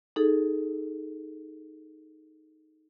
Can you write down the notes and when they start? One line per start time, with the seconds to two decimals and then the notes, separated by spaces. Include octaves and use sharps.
0.16 D#4 G#4 A4